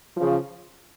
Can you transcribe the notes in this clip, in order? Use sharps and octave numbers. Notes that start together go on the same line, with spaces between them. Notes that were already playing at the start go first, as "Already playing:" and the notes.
C#3 F3